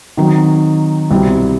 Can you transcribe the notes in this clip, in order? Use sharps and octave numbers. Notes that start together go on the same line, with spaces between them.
D#3 F#3 C4 D#4
C2 B2 G3 C4 E4